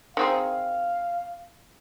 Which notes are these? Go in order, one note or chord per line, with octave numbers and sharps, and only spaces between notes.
D#3 C4 G#4 F5